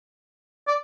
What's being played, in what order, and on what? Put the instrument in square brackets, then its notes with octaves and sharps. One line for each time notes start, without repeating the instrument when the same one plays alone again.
[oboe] D5